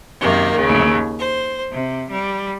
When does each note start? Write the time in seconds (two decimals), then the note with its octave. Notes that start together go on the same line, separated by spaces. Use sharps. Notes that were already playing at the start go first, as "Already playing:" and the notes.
0.21 F#2 C3 D#3 A#3
0.55 D#2 C#3
1.19 C5
1.72 C3
2.11 G3